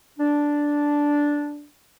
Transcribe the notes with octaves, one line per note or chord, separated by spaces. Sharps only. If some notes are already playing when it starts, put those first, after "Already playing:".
D4